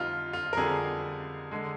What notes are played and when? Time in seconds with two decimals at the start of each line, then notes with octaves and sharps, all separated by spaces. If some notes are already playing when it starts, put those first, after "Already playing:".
Already playing: F2 D3 G3 D#4 F4
0.33 F4
0.53 A#4
0.57 F2 D3 G3 G#4
1.51 D3 G#3